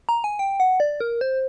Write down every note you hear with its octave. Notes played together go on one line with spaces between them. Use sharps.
A#5
G#5
G5
F#5
D5
A#4
C5